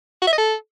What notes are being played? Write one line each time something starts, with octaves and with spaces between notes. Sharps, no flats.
F#4
E5
D#5
A4